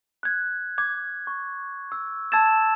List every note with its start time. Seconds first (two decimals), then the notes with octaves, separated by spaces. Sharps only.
0.23 F#6 G#6
0.78 D6 G#6
1.27 C#6
1.92 E6
2.32 A5 E6 G#6 A6 E7